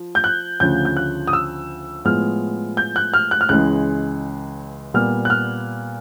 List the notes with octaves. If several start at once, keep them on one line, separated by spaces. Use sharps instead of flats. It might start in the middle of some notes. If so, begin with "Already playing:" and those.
Already playing: F3
G6
F#6
D2 C#3 F3 G6
G6
F#6
D#6
E6
A2 F3 G#3 B3 F6
G6
F#6
F6
F#6
F6
C#2 C#3 E3 G#3 F#6
A#2 G3 B3 F6
F#6
F6